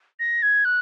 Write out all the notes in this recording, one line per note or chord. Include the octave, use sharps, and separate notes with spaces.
A#6
G#6
F#6